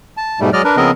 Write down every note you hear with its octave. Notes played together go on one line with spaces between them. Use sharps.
A5
G#2 B2 G3 A3
F#3 G#3 D5 D#5 F6
D4 A#4 B4
C#3 F3 B3 C4 A#4 D#5